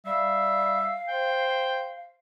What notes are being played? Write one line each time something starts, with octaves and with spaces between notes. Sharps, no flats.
G3 E5 F5
C5 G5